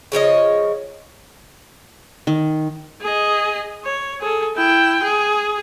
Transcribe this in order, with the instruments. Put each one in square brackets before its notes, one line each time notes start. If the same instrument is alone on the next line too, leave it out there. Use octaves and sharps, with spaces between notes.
[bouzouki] C#3 F3 C#5 D#5
[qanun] D#3
[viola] G#4 D#5
C#5
G#4 A4
E4 G5
G#4